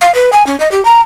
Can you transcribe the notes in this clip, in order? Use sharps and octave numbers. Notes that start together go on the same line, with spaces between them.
F5
B4
G#5
C#4
D#5
G4
A#5